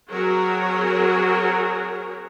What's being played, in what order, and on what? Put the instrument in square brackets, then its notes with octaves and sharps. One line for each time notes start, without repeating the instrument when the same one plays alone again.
[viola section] F#3 C4 F#4 G#4 A#4 C#5